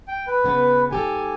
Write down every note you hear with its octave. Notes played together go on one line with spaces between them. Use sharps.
G5
B4
C#3 B3
G#2 G4 A4 G#5